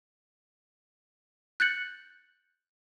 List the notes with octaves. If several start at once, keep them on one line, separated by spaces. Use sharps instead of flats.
F#6 G6 A6 C#7 F#7